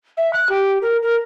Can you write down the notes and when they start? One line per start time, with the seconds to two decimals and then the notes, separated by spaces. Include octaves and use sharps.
0.17 E5
0.33 F#6
0.49 G4
0.82 A#4
1.02 A#4